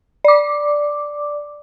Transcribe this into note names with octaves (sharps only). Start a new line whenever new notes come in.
D5 D6